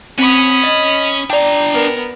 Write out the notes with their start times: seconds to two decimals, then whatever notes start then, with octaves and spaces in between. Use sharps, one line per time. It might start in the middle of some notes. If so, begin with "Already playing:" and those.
0.19 C4 C#4 B5 D#6
0.63 D#5
1.30 D4 D5 G5 A#5
1.72 B3 A#4